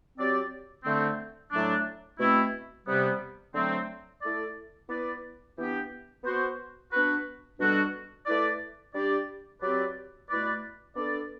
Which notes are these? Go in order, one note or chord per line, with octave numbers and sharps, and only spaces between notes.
F#3 C4 G4 D5
D3 A3 C4
A2 F#3 A3 D4
B2 A3 C4 E4
C3 G3 B3
D3 F#3 A3 C4
A3 E4 A4 D5
B3 E4 B4 D5
E3 B3 D4 G4
B3 F#4 C5
B3 D4 F#4 B4
B2 G3 D4 F#4 A4
A3 E4 B4 D5
G3 D4 G4 D5
F#3 C4 G4 B4 D5
B2 A3 E4 B4 D5
B3 D4 A4 D5